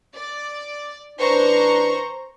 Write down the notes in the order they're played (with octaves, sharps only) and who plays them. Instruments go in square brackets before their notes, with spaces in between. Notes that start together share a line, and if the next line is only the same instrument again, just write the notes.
[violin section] D5
[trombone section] A1 D4 B4 [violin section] C5 A#5 C#6